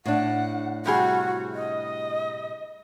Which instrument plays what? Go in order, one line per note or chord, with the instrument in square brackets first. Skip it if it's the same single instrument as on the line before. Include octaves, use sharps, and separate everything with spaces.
[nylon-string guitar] A2 D4 [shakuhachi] F#5
[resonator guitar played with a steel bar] C3 G3 G#4 [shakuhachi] F#4
[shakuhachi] D#5